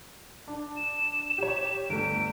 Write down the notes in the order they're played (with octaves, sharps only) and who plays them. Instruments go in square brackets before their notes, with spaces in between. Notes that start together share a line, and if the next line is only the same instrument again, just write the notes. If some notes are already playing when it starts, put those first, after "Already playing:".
[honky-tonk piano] D4
[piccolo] E7
[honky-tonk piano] G4 C#5
[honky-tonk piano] G1 A3 [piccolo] D7